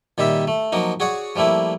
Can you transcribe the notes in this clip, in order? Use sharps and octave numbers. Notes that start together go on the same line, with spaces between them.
A#2 D#3 G3 G4 E5
A3
F3 F#3 A#3 D#4
F#4 G#4 C#5 D5 F#5
F3 G3 A3 A#3 E4